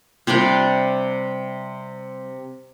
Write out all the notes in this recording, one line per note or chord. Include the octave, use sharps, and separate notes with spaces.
C3 G3 D4 D5